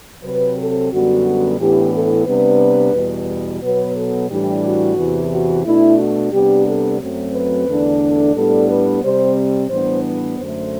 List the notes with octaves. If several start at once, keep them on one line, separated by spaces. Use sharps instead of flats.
C3 F#3 C4 B4
A4
F#2 D3 G3 B3 F#4
A2 E3 B3 D4 G4
A4
C3 G3 B3 D4 B4
E2 B2 G3 B3
B2 F#3 B3 B4
A4
A2 E3 G3 D4 G4
F#4
E2 C3 E3
F#4
B2 A3 D4 E4
F#4
C3 G3 B3 D4 G4
A4
F#2 F#3 A3 C4
B4
E2 D3 A3 D4
A4
A2 G3 B3 D4 A4
B4
C3 G3 C4 C5
A2 E3 G3 B3 D4 C5
B4
F#2 D3 A3 C5